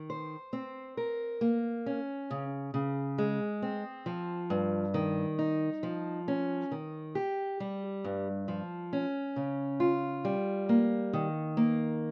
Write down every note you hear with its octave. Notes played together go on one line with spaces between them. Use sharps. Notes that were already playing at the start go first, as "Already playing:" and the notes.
Already playing: D#3
C5
C4
A#4
A#3
C#4
C#3
C#3
G#3
C4
F3
G2
D#3
D#4
F3
C#4
D#3
G4
G3
G2
F3
C#4
C#3
F4
G3
A#3
D#3
A#3